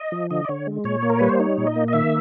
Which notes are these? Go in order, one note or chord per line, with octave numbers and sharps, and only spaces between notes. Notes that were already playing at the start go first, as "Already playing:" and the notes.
Already playing: D#5
F3
D3 D#5
D5
D3 C#5
G#3
A#2 C#5
A#3
A#4
G3 B4
C5
D#4 C#5
A#2
D#5
A#3
D#5
D#3 E5